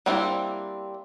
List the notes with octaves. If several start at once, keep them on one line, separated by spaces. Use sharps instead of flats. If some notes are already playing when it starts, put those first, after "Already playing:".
G3 A#3 C4 D4 E4